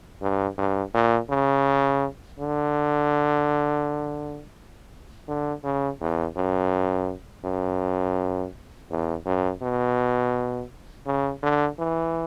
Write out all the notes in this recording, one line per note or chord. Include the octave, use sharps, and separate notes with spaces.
G2
G2
A#2
C#3
D3
D3
C#3
E2
F#2
F#2
E2
F#2
B2
C#3
D3
E3